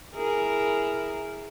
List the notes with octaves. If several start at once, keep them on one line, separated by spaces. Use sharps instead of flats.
E4 G#4 A#4